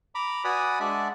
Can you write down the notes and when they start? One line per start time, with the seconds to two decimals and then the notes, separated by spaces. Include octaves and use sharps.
0.15 A#5 B5 D6
0.44 F#4 B4 D5 G#5 B5 D#6
0.80 G#3 D4 D5 E5 F#5